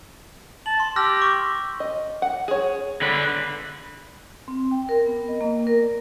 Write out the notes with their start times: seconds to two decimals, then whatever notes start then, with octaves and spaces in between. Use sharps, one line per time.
0.66 A5 F#7
0.80 C6
0.96 G4 E6 F6 A#6
1.22 C#6
1.80 D#5
2.22 F#5
2.48 G#4 C#5
3.02 D3 B4
4.48 C4
4.71 G5
4.89 A#4
5.06 B3
5.28 D#5
5.41 A#3
5.67 A#4
5.83 D5